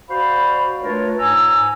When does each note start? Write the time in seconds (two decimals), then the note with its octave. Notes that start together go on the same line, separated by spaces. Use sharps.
0.10 F#4 C5 D5 F5 B5
0.82 A3 D4 F4 A#4 B4 C#5
1.19 G#2 C#5 G#5 A#5 E6